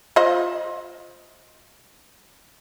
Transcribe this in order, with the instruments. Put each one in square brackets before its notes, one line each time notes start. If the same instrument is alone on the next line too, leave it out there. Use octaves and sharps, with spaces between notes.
[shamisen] F4 C5 D#5